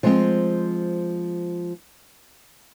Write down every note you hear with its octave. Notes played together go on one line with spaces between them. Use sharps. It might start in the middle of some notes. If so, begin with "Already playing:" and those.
F3 G#3 C4